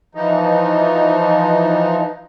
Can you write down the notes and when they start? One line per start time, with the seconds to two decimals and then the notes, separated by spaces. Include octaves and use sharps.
0.15 E3 F3 D#4